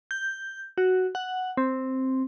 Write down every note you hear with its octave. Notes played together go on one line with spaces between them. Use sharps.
G6
F#4
F#5
C4